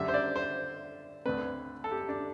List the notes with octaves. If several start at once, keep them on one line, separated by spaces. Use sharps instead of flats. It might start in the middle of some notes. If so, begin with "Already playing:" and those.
Already playing: F#2 D3 G3 E5
C5
D5
C5
D2 D3 A3 C4 B4
A4
G4
D4